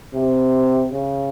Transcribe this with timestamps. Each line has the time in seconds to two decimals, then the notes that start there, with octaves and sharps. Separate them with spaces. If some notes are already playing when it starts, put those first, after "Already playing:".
0.14 C3
0.92 C#3